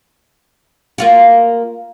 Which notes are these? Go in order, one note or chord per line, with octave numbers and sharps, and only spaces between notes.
A#3 F4 F#4